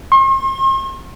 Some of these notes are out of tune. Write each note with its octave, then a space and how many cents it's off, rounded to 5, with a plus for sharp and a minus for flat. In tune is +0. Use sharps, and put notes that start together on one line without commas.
C6 +45